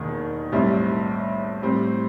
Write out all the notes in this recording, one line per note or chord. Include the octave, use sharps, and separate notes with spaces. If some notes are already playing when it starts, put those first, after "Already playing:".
Already playing: E1 D#2 D#3
B1 A2 G3 C4 E4
A2 G3 C4